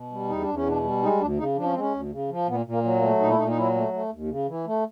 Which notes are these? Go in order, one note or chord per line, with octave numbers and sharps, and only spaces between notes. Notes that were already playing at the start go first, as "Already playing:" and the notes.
Already playing: B2
G3
E2 D#4
D4
E2
C#4
B2 D4
G3
G#3 D#4
D2 D4
C#3 D#4
F3 D4
C#4
C4
G#3
C#4
D2
C#3
F3
A#2 B3
A#2
A#3
F#3
A#3
A3
A#2 D#4
E4
A#2 D#4
D#4
F#3 E4
A3
A3
D#2
C#3
E3
A3